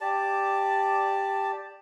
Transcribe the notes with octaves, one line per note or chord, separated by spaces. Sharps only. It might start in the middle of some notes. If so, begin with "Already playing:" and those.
G4 D5 A5